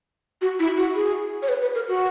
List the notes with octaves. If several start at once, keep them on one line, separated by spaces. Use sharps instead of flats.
F#4
E4
F#4
G#4
C#5
B4
B4
A#4
F#4